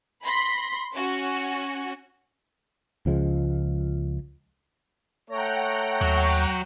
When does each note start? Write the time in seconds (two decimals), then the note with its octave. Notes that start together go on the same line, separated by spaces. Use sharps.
0.24 B5 C6 A#6 B6
0.93 C#4 F#4
3.06 C#2 F3 G#3
5.29 A3 C#5 F#5 G5 A#5
6.01 D#2 F#3